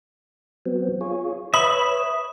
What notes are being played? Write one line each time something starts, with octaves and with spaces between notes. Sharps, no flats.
F#3 B3 C4
F4 G#4 C#5
B4 C#5 E5 B5 D#6